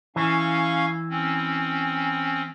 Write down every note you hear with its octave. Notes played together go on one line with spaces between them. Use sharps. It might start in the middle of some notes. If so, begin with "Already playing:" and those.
E3 C#4 F5 C#6
C4 C#4